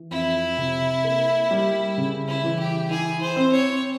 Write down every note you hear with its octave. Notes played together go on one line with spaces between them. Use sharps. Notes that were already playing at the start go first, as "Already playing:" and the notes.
Already playing: E3
F2 E4
C3
A#3
G3
C#3
E4
E3
G4
E4 G#4
C5
C4
C#5